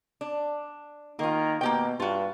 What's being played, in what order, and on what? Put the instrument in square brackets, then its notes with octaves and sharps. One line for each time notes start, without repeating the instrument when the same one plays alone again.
[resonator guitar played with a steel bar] D4
[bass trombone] D#3 [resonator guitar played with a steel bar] A#3 F4
[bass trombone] B2 [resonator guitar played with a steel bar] A#3 G4 G5
[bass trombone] G2 [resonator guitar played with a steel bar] F4 F#4